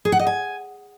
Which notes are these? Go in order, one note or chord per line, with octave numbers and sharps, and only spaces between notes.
G#4
F#5
D#5
G#5